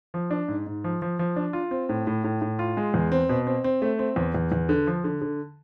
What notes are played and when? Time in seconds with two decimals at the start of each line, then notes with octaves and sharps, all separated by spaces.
0.14 F3
0.31 D4
0.48 G#2
0.67 G#2
0.84 F3
1.02 F3
1.19 F3
1.36 D4
1.53 F4
1.71 C4
1.89 A2
2.07 A2
2.24 A2
2.42 A2
2.59 F4
2.77 G#3
2.94 E2
3.12 C4
3.29 B2
3.47 C4
3.64 C4
3.82 A3
3.99 C4
4.16 E2
4.35 E2
4.52 E2
4.69 D3
4.87 F3
5.04 D3
5.21 D3